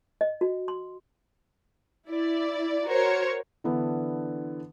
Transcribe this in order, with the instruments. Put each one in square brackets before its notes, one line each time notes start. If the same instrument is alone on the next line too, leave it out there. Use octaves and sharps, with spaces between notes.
[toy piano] D#5
F#4
C6
[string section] E4 D5
F#4 A#4 C5 C#5
[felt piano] D3 E3 B3 D4 E4